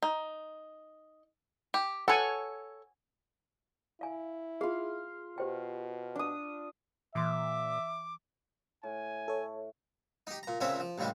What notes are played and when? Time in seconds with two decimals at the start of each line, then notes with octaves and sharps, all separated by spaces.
0.02 D#4
1.74 G4
2.08 A4 C#5 F#5 G#5
4.01 E4 F5 G#5
4.61 F4 G#4 F5
5.38 B2 G4 C5 G5
6.15 D4 D#6
7.15 A#2 E3 E5 C6 D6
8.83 A2 G#5
9.28 A4 C#5
10.27 D#4 G4
10.43 A#2 A#5
10.61 C#2 A#2 C4 C#4 C#5 E5
10.80 F3
10.98 A1 D#2 C#3 G3 G#3